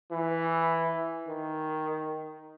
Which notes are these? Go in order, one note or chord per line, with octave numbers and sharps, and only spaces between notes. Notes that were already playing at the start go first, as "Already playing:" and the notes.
E3
D#3